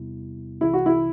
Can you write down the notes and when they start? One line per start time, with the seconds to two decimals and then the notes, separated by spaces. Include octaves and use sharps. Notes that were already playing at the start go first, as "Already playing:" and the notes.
Already playing: E2 C3 G3 B3 E4
0.61 C2 C3 E3 E4
0.73 F#4
0.86 E4